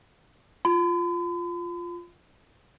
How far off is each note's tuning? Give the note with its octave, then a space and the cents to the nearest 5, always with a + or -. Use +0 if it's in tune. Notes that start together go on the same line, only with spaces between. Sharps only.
F4 +0 B5 +45